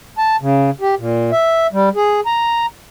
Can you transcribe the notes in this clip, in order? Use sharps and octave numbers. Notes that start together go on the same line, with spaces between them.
A5
C#3
G4
A#2
E5
G3
G#4
A#5